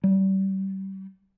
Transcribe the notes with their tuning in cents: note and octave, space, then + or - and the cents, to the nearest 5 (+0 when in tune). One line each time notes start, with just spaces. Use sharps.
G3 -30